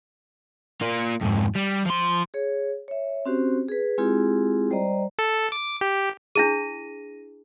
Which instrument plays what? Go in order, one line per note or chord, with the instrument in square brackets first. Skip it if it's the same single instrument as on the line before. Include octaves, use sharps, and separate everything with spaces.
[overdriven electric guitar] A#3 F4
F2 G#2
G3
F3 C6
[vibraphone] G#4 C#5
C#5 E5
C4 C#4 F#4 G4 C5
G#4 B4
G#3 C4 E4 F4 G4 G#4
G3 C5 D5 D#5 A#5
[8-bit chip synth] A4
D6
G4
[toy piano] D4 E4 G#4 [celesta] A#6 D#7